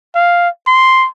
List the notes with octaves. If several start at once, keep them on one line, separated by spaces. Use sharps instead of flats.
F5
C6